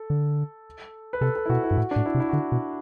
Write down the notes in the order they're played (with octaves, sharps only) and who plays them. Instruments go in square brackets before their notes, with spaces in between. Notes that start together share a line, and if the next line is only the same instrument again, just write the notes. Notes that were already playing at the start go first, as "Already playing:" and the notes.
Already playing: [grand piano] A4
[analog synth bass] D3
[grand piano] B4
[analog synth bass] C3 [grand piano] A4
[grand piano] A4
E4
[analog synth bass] B2 [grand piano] F#4
[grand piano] E4
[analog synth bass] G2
[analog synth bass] A2 [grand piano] F#4
[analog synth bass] A2 [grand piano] D4
[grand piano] E4
[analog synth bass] C3
[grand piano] E4
F#4
[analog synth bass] D3 [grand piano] E4
[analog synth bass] B2